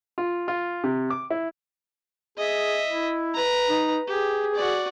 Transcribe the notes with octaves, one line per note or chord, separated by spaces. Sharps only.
F4
F4
C3
D6
E4
G#4 D#5 E5
E4
B4 A#5
D#4
G4 G#4
F#4 D5